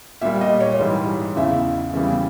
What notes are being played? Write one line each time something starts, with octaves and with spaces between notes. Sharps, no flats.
A#2 G3 E5
D#5
C#5
G#2 E3 G3
E2 C#3 E3 E5
E2 C#3 E3 G3